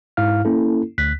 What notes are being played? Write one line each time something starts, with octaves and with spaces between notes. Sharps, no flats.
G#2 E4 F5 F6
A#3 C#4 E4 A4
D2 F#6 B6